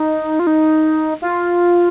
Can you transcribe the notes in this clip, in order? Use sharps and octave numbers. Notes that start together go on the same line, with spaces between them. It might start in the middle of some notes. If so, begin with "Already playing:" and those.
Already playing: D#4
F4
D#4
F4